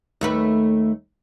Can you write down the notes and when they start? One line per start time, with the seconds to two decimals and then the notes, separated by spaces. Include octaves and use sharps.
0.21 D#2 A3 B4